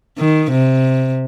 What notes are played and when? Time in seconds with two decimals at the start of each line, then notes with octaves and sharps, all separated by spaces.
0.18 D#3
0.51 C3